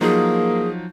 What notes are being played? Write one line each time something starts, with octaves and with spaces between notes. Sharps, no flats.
F3 F#3 A#3 D#4 G#4